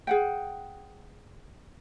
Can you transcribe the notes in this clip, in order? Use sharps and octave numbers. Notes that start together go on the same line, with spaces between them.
G#4 F#5 G5